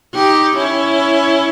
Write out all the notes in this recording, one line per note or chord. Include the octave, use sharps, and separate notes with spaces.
D#4 G4
C#4 E4